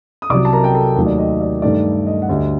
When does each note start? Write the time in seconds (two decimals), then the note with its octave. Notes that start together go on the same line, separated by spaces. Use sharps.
0.22 D#6
0.30 C2 C3 F#3 D5 D6
0.45 A5
0.52 A#4 A#5
0.64 G5
0.75 A4 A5
0.96 D#2 D#3 F#3 A3
1.06 D5
1.19 D#5
1.41 D5
1.62 G2 D#3 A3 D5
2.07 D#5
2.22 F#5
2.29 D2 D3 G3 D#5